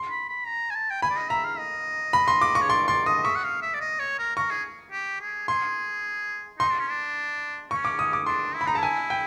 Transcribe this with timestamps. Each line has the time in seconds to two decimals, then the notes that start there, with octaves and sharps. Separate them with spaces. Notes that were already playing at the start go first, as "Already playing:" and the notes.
Already playing: C6
0.09 B5
0.28 B5
0.46 A#5
0.70 G#5
0.75 A5
0.90 G5
1.02 G#5 B5
1.10 D5
1.16 D#5
1.30 E5 A#5
1.45 F5
1.58 D#5
2.13 B5
2.28 C6
2.42 D6
2.55 C#6
2.61 C#5
2.69 D5 C6
2.88 D5 C6
3.06 D#5 D#6
3.25 E5 C#6
3.35 F#5
3.44 F5
3.62 E5
3.74 D5
3.81 D#5
3.99 C#5
4.19 A#4
4.36 A#4 C#6
4.50 G#4
4.92 G4
5.21 G#4
5.48 G#4 C6
6.59 D#4 C6
6.69 D4
6.79 C#4
6.89 D4
7.71 C#4 C#6
7.85 D6
7.99 D#6
8.13 D6
8.26 D4 C6
8.55 E4
8.61 B5
8.67 D#4 A#5
8.75 A5
8.79 E4 G#5
9.10 G5